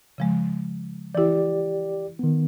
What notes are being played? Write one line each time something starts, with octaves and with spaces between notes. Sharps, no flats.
C#3 F3 G#3
E3 E4 G4 D5
D#3 B3